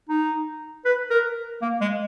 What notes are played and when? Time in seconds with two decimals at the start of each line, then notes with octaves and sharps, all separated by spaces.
0.09 D#4
0.85 B4
1.11 A#4
1.62 A#3
1.81 G#3